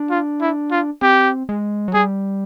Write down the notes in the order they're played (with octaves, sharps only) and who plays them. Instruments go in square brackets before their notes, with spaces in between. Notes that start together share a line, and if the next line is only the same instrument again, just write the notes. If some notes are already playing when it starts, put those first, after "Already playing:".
Already playing: [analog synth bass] D4
[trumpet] F4
E4
F4
[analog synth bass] C4 [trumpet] G4
[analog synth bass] G#3
F#3
[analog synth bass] G3 [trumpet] G#4